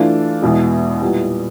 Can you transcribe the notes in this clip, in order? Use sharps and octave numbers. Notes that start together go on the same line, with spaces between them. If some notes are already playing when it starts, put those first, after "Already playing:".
Already playing: E3 A3 D4 F4
E2 B2 G#3
A#2 G3 B3 E4 G4